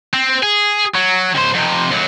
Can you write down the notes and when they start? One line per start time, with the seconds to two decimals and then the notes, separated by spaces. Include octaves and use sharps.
0.14 C4
0.43 G#4
0.95 F#3
1.35 C#2 C5
1.54 F2 C3
1.91 D#2 F#3